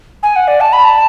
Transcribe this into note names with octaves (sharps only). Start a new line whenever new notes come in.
G#5
F#5
D5
A5
B5
A5